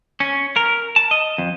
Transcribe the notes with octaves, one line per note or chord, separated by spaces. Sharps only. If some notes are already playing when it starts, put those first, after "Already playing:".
C#4
A#4
A5
D#5
F2